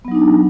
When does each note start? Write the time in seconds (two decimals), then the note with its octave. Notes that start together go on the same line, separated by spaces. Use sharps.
0.05 B3
0.08 F#3
0.11 D#4
0.15 D4